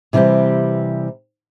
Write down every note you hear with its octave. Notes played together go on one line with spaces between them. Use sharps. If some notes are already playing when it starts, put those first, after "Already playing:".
C3 E3 G3 C4 G4